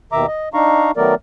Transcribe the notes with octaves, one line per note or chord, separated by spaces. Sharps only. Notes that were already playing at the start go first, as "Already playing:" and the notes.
D#2 B2 D#3 E5 A#5 D6
D#5
D4 D#4 F5 A#5 C#6
D#3 F#3 A3 B3 A#4 D5